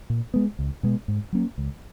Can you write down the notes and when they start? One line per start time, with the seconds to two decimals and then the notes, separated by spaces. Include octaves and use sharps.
0.10 A#2
0.34 G#3 B3
0.59 C#2
0.83 B2 G#3 B3
1.08 G#2
1.33 F#3 A#3 C#4
1.58 C#2